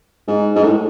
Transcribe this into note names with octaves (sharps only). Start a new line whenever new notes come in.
G#2
G#2
A2